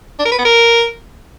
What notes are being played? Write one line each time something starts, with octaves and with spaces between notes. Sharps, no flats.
D4
A#4
B4
B3
A#4